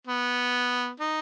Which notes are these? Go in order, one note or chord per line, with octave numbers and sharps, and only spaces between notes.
B3
D#4